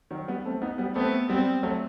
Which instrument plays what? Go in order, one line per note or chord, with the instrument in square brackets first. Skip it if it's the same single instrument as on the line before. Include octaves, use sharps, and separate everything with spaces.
[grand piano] D#3 F#3
G3 B3
A3 C4
B3 D#4
G3 B3
[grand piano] A3 C4 [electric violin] B3
[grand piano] G3 B3 [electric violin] C4
[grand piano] F#3 A3